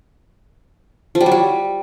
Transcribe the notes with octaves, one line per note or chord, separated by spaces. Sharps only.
F3
G3
F#3
G3